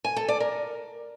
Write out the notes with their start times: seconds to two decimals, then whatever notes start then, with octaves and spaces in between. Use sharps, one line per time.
0.05 G#5
0.16 A4
0.28 D5
0.40 A#4